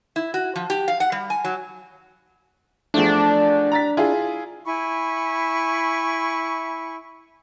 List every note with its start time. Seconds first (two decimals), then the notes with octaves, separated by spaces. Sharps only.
0.16 E4
0.34 F#4
0.56 F3
0.70 G4
0.88 F5
1.00 F#5
1.12 G3
1.30 G#5
1.44 F#3
2.94 E2 F3 A3 D4
3.72 A#5 A6 B6
3.97 E4 F4 G#4
4.65 E4 G#5 B5 C#6